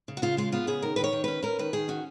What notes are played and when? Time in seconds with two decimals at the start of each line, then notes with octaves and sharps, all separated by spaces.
0.08 C#3
0.17 F#4
0.22 C#3 F4
0.37 G#3 F4
0.52 B3 F4
0.67 C#3 G#4
0.82 D#3 A#4
0.96 D#3 B4
1.04 C#5
1.13 D#3
1.24 C#4 B4
1.42 C#4 A#4
1.59 D#3 B4
1.73 D#3 G#4
1.88 C#4 F#4